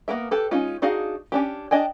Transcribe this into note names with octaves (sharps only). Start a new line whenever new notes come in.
A#3 B3 A#4 E5
G4 A4 B4
G#3 C#4 D#4 F4
D4 D#4 F#4 G#4 F5
C#4 D4 G4
D4 D#5 G5 G#5